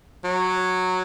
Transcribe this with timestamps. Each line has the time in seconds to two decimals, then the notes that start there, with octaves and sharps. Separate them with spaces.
0.24 F#3